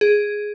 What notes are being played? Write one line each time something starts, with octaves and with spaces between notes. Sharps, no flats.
G#4